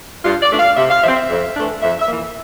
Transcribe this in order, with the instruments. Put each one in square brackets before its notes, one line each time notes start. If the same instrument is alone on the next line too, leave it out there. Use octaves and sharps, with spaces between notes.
[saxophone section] G2 F4
D5
E3 A3 D4
F5
C3 E5
F5
F3 E5
C4
E5
F2
E3 A3 D4
F2 E5
E5
E3 A#3